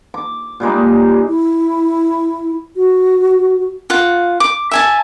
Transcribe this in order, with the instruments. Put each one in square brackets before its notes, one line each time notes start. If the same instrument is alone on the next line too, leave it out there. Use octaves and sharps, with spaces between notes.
[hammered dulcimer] D6
A#2 G3 G#3 D#4
[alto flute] E4
F#4
[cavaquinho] F4 F5 F#5
D6
E5 G#5 A5